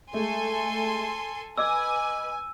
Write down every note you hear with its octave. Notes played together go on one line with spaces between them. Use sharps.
G#3 A3 A4 G#5 C6
B4 D#5 G#5 D6 E6 G#6